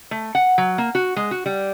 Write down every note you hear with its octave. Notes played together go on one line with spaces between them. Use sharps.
A3
F#5
F#3
A#3
F#4
G#3
F#4
G3